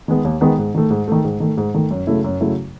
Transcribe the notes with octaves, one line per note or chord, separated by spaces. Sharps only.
D#3 G#3 B3
D#2
D#3 G#3 B3
G#2
D#3 A3
G#2
D#3 A3
G#2
D#3 A3
G#2
D#3 A3
F#2
C#3 F#3 A3 E4
F#2
C#3 F#3 A3 E4